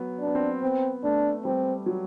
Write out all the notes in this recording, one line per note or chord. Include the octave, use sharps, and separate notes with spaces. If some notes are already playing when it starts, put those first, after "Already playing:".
Already playing: F#3 B3
D4
B3
C4
B3 C4
A3 D4
G3 C4
F#3